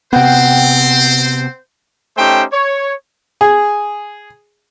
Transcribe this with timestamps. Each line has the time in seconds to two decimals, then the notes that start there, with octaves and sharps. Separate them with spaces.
0.13 C3 B3 C4 C5 F#5 G5
2.17 A3 C#4 D#4 G4 C5 G5
2.53 C#5
3.41 G#4